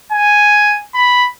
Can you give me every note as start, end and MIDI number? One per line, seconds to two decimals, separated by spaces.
0.12 0.79 80
0.95 1.27 83